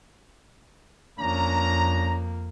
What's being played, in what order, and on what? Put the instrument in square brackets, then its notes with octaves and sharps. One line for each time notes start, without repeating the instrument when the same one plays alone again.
[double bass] F2 A#3 [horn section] C#4 D4 A#5